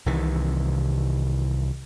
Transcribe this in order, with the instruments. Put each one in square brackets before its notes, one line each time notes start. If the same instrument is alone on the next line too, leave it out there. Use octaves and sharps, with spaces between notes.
[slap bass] C2 C3 D#3 E3